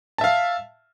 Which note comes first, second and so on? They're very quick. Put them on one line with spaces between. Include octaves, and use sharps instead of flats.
A5 E5 F5